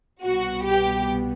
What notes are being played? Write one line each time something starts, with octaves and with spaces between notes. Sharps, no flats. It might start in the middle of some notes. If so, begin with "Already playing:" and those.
C2 B2 G3 B3 F#4
G4